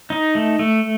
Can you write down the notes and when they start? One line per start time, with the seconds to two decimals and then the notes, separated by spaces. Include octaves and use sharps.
0.10 D#4
0.35 A3
0.59 A3